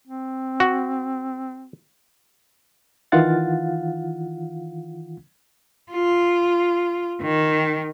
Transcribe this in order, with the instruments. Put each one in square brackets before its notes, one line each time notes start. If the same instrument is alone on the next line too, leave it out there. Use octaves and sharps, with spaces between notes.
[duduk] C4
[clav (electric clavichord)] F#4
[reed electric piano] D#3 E3 F4 F5 F#5 A6
[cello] F4
D#3